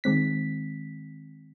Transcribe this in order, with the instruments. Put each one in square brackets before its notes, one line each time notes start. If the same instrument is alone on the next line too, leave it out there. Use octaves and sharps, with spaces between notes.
[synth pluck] D#3 G#3 C4 B6